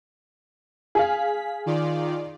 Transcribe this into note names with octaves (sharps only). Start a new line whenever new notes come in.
G#4 F5 B6
D#3 F4 D5